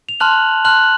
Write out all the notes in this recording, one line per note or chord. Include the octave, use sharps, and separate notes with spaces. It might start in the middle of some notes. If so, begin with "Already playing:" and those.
F7
A5 C6 F6 F#6 F#7
A5 C6 F6 F#6 F#7